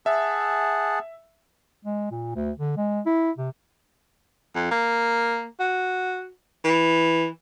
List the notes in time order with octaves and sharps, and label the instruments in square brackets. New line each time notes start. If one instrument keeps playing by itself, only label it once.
[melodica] G#4 F#5 A5 [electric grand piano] E5
[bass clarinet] G#3
A#2
D2
D3
G#3
E4
C3
[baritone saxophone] F2
A#3
F#4
E3